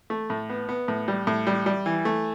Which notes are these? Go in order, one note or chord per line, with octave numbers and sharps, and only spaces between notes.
A3
A2
B3
B3
A2
G3
A2
G3
G3
E3
A3